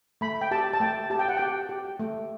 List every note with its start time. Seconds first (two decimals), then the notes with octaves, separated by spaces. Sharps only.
0.21 A3 B5
0.41 G5
0.51 G4 A5
0.73 A5
0.80 A3 G5
1.10 G4 A5
1.19 G5
1.28 F#5
1.37 G4 G5
1.69 G4
2.00 A3